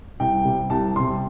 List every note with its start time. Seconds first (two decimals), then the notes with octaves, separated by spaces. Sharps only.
0.20 C2 G5
0.45 C3 G3
0.70 C2 A5
0.96 C3 G3 C6